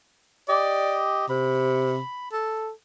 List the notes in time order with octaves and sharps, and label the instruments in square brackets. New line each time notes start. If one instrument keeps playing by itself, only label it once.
[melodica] G4 D#5 [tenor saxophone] D5
[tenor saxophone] C3 [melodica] B5
[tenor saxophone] A4